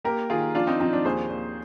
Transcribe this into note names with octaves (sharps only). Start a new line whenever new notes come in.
A#3 G4 A#4
D#3 F4 G#4
F3 D4 F4
C4 D#4
F3 C4 D#4
D4
D#2 G#4 C5
D#2